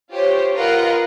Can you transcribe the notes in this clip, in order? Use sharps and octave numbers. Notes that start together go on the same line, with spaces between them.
F4 G4 C5 C#5
F4 A#4 B4 D#5 F#5 A#5